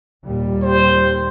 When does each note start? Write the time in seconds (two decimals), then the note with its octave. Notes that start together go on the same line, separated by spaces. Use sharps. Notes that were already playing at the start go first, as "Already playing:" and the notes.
0.24 D#2 A#2 G3
0.62 C5